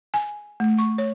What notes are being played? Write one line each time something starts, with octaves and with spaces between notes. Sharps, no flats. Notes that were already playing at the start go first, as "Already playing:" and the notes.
G#5
A3
C#6
C#5